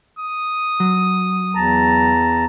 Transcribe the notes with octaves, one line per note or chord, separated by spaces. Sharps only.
D#6
F#3
E2 A5 A#5